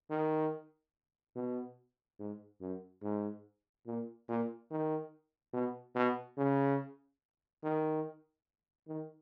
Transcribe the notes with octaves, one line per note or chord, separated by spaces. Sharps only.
D#3
B2
G#2
F#2
G#2
A#2
A#2
D#3
B2
B2
C#3
D#3
D#3